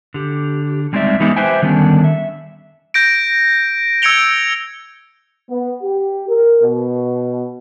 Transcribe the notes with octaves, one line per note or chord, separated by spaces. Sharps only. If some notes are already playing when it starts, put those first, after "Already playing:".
D3 G4
G3 G#3 C4 D#4 D5 E5
E3 G3 G#3 B3 D#4 E4
G4 B4 C5 E5 G5 G#5
D3 D#3 G3 B3 C#4 D4
E5
G6 A#6 D7
E6 G#6 C#7 D7 F7 G7
B3
G4
A#4
B2